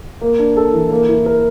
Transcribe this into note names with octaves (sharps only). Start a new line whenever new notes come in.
A#3
D4
A4
E3
A#3
E4
A#4